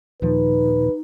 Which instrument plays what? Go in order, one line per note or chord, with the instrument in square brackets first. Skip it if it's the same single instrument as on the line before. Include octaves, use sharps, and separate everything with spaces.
[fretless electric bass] D#2 D#3 F3 [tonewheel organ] A#2 [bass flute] D#4 [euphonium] B4